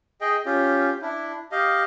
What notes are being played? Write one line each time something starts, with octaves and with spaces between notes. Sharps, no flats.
G#4 D#5 G5
C#4 F4 G4
D4 E4
G4 D#5 F5